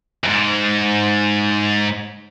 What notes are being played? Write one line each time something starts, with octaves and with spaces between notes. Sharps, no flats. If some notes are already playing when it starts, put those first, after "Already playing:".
E2 G#2